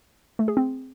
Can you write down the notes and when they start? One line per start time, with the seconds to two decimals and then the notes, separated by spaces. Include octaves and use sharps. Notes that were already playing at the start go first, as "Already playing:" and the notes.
0.39 A3
0.48 G#4
0.57 C4